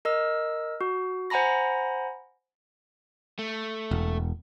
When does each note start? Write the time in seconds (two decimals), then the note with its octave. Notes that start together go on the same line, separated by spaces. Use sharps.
0.05 A#4 D#5 E6
0.81 F#4
1.30 C5 F#5 G#5 A#5 B5 A#6
3.39 A3
3.91 E1